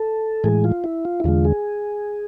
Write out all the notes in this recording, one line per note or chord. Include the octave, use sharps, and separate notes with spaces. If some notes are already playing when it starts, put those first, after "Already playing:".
Already playing: A4
A2 E3 G#3 G#4
F4
E4
F4
E4
E2 D3 G#3 F4
G#4